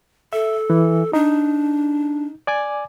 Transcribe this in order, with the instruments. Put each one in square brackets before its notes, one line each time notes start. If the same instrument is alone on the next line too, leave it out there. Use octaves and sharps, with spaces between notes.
[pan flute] A4 [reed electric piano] E5
[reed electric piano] E3
[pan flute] D4 [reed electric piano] D#4
[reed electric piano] D5 G#5 D6